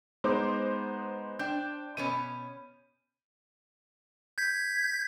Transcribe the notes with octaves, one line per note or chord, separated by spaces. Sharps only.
G#3 B3 D#4 C5 D6
D4 G5 G6
B2 B3 C#4 D#7
G6 G#6 B6